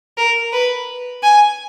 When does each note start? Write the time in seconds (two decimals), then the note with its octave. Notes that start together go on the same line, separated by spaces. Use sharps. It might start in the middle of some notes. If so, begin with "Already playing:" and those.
0.18 A#4
0.52 B4
1.23 G#5